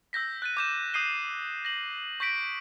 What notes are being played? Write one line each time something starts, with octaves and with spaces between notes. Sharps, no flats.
E6 G6 A#6 B6
F#6 A6 D#7
D6 G6 E7
D#6 G6 C7 D#7 G7
A#6 F#7
C#6 G6 A#6 B6 D7